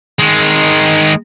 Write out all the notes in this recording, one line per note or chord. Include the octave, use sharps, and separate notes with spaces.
D#3 G#3